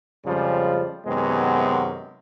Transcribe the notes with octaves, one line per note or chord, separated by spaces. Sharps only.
F2 C#3 F3 G3 G#3
F#2 C3 D#3 G#3 B3